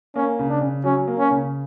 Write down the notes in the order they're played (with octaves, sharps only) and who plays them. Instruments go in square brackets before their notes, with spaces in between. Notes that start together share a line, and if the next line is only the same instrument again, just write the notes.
[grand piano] A#3 [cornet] C#4
[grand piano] C#3
[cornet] D4
[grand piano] C#3
[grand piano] F#3 [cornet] C#4
[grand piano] A#3
[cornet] C#4
[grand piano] C#3